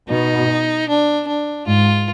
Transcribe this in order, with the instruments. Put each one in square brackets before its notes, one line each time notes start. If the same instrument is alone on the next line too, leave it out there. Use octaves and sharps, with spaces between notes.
[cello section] B2 [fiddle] D#4
[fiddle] D4
D4
[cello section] G#2 [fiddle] F4